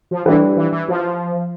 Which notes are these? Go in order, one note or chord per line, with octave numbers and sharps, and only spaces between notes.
F3
E3 G3 D4 G4 B4
E3
E3
F3